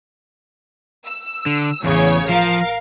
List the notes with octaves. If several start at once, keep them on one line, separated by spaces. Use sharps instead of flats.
E6
D3
A1 E2 C#3 C#5
F3 A#4 F5